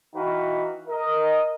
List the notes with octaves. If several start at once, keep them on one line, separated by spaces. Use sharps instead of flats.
E3 D#4 F#4 B4 F5 G5
A#4 D#5